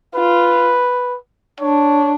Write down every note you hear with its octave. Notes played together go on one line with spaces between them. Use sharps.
F4 B4
D4 C#5